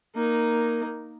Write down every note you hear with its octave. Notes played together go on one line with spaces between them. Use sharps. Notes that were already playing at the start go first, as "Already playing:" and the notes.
A#3 D#4